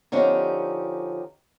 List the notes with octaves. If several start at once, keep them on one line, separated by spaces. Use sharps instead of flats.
D3 F3 C#4 D#4 G4